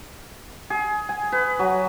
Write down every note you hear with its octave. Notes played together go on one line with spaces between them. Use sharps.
G#4
G#5
B4
F#3